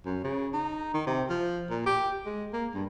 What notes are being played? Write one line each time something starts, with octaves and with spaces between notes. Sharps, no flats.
F#2
C#3
D#4
D#3
C3
F3
A#2
G4
G#3
A#3
G2